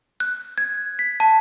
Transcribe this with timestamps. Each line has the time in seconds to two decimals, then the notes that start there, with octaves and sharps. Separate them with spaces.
0.20 F#6
0.58 G#6
0.99 B6
1.20 A5